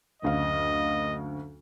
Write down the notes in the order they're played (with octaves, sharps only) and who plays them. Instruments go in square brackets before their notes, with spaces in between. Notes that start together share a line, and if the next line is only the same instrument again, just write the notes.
[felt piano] F#1 D2 F5 [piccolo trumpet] D#5